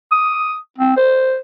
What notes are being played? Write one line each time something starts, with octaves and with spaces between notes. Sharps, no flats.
D#6
C4
C5